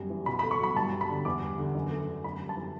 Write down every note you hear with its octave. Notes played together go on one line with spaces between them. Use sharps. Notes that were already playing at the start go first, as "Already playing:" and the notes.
Already playing: F#2 G3
E3
B2 B5
B5
A3
C#6
F#3 B5
G2 A5
G3
B5
D3
E2 D6
G3
D3
F#2
A3
D3
F#2 B5
G3
A5
E3